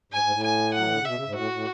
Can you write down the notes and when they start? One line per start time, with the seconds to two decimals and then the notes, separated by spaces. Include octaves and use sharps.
0.12 G#2 G#5
0.23 G#2
0.33 A2
0.43 G#5
0.74 F#3 F#5
0.84 E3
0.91 D3
0.98 C#3
1.05 B2 E5
1.15 C#3
1.25 G#2
1.36 A2 F#4
1.51 A2